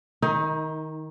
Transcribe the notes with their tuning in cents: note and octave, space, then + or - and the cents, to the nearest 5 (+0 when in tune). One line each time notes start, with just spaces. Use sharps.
D#3 +0 D#4 +30